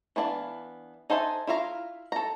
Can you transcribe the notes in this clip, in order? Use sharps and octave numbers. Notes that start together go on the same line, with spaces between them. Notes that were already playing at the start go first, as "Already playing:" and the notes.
E3 B3 D4 F5
D#4 A4 C5 E5 G#5
E4 F4 E5 F5 A#5
A4 A#5